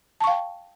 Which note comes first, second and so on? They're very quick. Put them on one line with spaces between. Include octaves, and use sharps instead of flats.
A5 C#6 F5 G5